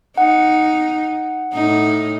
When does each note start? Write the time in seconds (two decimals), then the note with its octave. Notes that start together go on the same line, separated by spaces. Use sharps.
0.18 D#4 F#5
1.53 A2 D#4